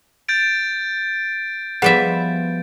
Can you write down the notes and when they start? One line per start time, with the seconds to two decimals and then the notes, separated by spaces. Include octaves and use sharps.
0.29 G6 A6 D7
1.82 F3 G3 B3 G#4 B4 D5 E5 F#5